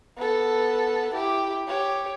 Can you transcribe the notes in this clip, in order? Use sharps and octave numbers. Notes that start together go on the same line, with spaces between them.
B3 A4
E4 G4
G4 C#5